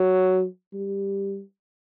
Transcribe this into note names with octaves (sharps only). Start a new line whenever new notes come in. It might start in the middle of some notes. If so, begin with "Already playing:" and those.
Already playing: F#3
G3